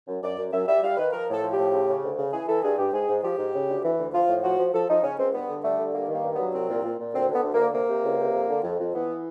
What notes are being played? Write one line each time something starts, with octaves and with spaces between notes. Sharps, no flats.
F#2
F#2 D5
F#2
F#2 E5
G3 E5
G3 F5
D#3 B4
F3 A#4
A2 A4
F3
G4
A2
C#3
C#3
D2
C#3
E3 G#4
E3 A4
G2 G#4
G2 G4
G#2 G#4
G#2
F3 G4
G#2
C#3
D2
E3
D2
F3 F4
A2
F3 F#4
F3
F3 A4
F3 D#4
C#3 C#4
C#2 C4
G2 B3
D3
G3 A3
D3
G2 A#3
D#3
A#3
G2
F#3 B3
C2 C4
A#2
A#2
A#2
D2 C4
D3
B3
D2
A#3
D3
C3 A#3
C3
C#2
C3
F2
D3
F2
F2
E3 B3